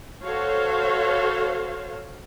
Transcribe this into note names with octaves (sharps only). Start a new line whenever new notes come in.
F#4 A4 C5 C#5 F5